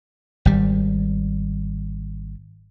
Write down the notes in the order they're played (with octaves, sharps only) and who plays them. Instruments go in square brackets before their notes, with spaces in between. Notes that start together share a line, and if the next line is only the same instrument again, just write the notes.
[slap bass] G#1 G3